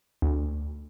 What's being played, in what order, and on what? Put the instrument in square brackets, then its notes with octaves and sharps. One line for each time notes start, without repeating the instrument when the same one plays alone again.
[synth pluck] D2